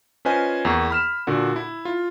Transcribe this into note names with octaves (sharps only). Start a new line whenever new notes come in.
C#4 F4 B4 C5 D#5 G#5
E2 A#3 C#6
B5 F6 E7
A#2 D3 F#4
E4
F4